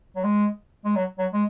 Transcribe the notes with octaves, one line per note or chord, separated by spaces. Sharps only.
F#3
G#3
G#3
F#3
F#3
G#3